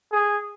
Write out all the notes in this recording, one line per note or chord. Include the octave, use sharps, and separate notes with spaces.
G#4